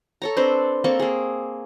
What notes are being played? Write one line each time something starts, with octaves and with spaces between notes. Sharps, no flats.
A4 C#5 A#5
C4 D4 B4 C5
A#3 C4 A4 C#6
A#3 G#4